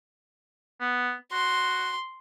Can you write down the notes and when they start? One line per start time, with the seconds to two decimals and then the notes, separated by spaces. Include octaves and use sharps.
0.81 B3
1.32 F#4 C6